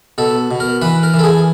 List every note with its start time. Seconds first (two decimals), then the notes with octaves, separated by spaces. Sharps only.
0.18 B2 A4
0.51 B2
0.60 A#4
0.82 E3 B4
1.03 A#4
1.14 E3
1.19 A4
1.24 G#4